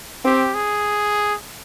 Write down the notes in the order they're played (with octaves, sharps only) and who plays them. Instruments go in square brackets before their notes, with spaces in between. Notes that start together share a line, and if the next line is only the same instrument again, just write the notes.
[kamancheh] C4 [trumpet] G4
[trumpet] G#4